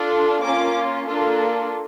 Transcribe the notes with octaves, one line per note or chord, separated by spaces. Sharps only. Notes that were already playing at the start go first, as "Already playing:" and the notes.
Already playing: D4 F4 A4
A#3 C#4 F4 D6
A#3 D4 F4 A4